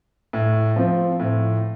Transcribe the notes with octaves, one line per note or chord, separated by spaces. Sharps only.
A2
F3 C4
A2